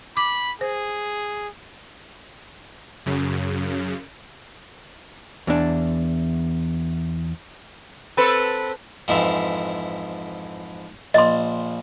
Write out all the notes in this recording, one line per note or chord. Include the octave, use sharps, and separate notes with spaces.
B5 D6
G#4 C5
F#2 C#3
E2 D4
C4 A4 B4
F2 G#2 E3
A#1 D#5 C6